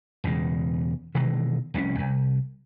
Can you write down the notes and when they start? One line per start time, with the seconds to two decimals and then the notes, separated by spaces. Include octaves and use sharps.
0.24 E1 E2 C#3 G#3
1.15 B2 D#3 E3 G#3
1.74 F1 C2 B2 C#4
1.98 C2